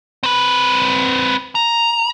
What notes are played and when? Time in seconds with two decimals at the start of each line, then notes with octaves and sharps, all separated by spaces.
0.23 C4 B4
1.55 A#5